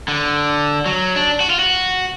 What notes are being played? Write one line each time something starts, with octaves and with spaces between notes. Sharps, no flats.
D3
F#3
D4
F#4
F4
F#4